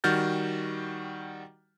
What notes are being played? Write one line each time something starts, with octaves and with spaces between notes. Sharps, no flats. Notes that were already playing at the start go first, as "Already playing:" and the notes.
D#3 G3 F#4 F6 G6 A6